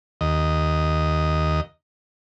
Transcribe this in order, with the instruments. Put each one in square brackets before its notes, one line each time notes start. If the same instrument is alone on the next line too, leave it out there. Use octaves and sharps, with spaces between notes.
[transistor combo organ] D#2 D#5